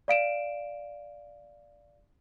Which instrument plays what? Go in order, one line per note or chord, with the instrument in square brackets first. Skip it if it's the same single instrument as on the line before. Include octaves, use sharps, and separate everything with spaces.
[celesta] D5 F5 D7 E7